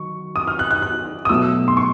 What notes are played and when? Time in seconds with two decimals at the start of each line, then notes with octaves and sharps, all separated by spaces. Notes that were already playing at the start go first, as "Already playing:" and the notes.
Already playing: D#3 F#3 C#6
0.36 D#6
0.47 F6
0.59 F#6
0.71 F#6
0.82 F#6
1.25 D#6
1.29 B2 F#3 A3 E6
1.68 C6
1.77 C#6